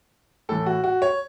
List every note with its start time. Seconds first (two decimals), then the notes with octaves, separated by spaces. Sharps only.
0.49 A2 E3 A4
0.66 F#4
0.84 F#4
1.02 C#5